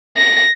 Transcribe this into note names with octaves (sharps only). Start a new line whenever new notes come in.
A#6